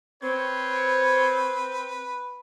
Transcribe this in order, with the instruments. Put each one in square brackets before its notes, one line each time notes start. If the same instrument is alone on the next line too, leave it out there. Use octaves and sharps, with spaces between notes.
[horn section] C4 [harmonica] B4 [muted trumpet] C#5